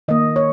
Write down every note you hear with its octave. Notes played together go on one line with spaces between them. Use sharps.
D#3 A#3 D#5
C#5